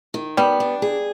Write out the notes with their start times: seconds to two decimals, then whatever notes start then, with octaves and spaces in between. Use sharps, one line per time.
0.14 D#3
0.37 G3 B3
0.60 D4
0.82 G#4